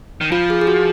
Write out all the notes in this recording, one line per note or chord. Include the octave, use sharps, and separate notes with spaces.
D#3
F3 F4
G#4
G#4
F#4